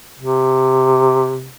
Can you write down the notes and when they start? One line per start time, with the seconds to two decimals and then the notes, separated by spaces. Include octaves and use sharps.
0.19 C3